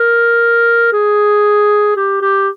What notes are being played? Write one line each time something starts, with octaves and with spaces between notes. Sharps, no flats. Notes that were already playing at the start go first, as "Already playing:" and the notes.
Already playing: A#4
G#4
G4
G4